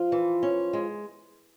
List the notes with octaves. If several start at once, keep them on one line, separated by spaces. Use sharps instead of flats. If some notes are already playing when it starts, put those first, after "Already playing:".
Already playing: F3 F4
E3
C#4
G#3